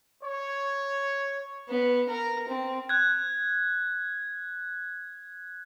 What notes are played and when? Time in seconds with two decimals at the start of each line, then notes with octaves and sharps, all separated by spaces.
0.22 C#5
1.69 B3
2.10 A#4
2.49 C4
2.89 F#6 G#6